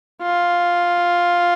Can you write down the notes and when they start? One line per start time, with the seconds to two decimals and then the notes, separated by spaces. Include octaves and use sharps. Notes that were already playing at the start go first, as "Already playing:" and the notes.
0.22 F4